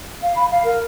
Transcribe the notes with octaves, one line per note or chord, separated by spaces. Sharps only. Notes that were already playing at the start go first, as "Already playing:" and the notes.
F5
B5
F5
A#4